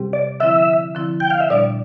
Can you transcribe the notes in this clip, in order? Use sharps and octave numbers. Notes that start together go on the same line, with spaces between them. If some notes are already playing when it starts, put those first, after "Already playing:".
Already playing: C3 G3 C4 G4
D5
D3 F3 C4 E4 E5
D3 F3 C4 E4
G5
F5
E5
A#2 G3 D4 D5